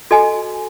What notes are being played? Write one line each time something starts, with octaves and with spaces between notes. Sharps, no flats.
F#4 A4 D#5 G#5